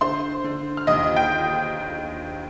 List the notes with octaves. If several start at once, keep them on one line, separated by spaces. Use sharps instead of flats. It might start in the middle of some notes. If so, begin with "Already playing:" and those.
D3 C5 C6
D3
F6
D#2 D#5 D#6
G5 G6